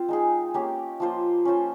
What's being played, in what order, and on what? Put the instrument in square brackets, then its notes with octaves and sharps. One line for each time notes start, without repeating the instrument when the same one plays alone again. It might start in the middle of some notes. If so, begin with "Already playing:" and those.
Already playing: [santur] C4 F4 C5 F5
G#3 D#4 G#4
A#3 C#4 G4
F3 A#3 F4 C5
C#4 F4 C5